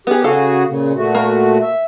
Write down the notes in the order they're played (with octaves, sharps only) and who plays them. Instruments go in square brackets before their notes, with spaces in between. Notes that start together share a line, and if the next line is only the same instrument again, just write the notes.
[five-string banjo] B3 G#4 [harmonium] G4
[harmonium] C#3 F#4 G#4 [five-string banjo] A4 F5
[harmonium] A#2 C#3
A#2 A3 F#4
[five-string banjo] A#3
[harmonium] E5